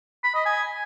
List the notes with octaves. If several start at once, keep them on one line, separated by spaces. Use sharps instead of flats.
B5
D#5
G#5